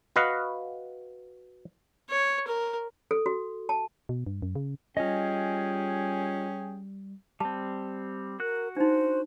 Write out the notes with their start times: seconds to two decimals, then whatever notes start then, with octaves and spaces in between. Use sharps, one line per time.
0.16 F#4 B4 D#5 F5 F#5
2.10 C#5
2.48 A#4
3.11 A4
3.26 F#4
3.69 A5
4.09 B2
4.27 G2
4.42 F#2
4.55 C#3
4.97 G3 C#4 F4 G#4 D#5 G5
7.40 G3 C4 A5
8.40 F#4 A#4 F#6
8.77 D4 D#4 C5